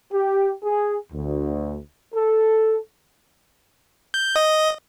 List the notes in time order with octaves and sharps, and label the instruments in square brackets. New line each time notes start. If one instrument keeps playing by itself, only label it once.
[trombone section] G4
G#4
D2
A4
[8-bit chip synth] G6
D#5